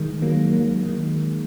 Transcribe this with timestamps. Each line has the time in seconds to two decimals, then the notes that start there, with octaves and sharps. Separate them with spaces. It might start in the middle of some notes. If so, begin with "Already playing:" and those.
Already playing: D#3 G#3
0.22 F#3 A#3
0.53 F#3 A#3
0.83 D#3 G#3